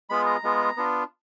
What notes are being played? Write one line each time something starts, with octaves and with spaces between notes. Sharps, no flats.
G#3 B3 F4 G#4 B5
A#5
G#3 B3 F4 G#4
B3 D4 F4